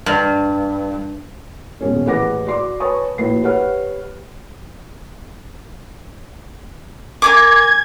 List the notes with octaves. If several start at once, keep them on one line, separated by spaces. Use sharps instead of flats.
G2
D#1 B2 G#3 C#4
A1 G#4 B4 F#5 D6 A#6
F#4 D5 C6 D6
B4 C#5 G#5 A5 C#6 D#6
A#1 A2 F#4 B4 C7
G4 B4 C#5 F#5 F6
A#4 G#5 D6 G#6